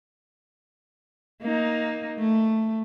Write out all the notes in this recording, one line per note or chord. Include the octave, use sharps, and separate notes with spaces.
A#3 D#4
A3